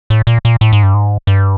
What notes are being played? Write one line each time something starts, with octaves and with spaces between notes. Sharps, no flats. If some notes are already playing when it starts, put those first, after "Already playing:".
A2
A#2
A#2
A2
G#2
G2
G#2
G2